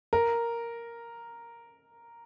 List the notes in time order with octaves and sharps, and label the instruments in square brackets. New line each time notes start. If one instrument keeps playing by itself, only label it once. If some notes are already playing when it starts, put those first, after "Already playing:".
[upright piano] A#4